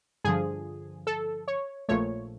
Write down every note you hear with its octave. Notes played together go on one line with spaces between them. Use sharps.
G2 D3 F3 G#4
A4
C#5
A#1 A#2 F3 A3 C#5